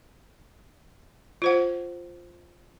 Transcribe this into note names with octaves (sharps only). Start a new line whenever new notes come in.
F4 C5 F#5